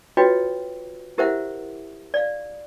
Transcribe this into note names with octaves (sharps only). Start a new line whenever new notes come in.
F4 F#4 B4 C#5 D#5 G5
E4 G4 A#4 C5 E5 F#5
D5 F5